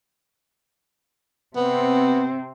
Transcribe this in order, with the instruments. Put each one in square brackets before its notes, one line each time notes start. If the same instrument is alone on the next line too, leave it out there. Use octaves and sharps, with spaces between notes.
[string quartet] C3 C4 [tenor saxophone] B3